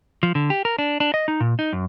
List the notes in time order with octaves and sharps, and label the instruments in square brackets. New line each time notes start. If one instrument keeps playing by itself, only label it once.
[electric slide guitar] F3
D3
G4
A#4
D4
D4
D#5
D#4
A#2
D#4
F#2